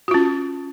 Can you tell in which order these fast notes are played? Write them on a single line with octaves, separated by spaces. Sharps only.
F#4 F4 C#4